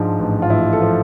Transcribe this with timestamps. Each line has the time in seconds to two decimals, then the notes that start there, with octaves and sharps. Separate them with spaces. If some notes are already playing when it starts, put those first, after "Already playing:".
Already playing: G#2 F3 D4
0.19 A1
0.42 F4
0.49 A1 E4
0.73 A4
0.81 F3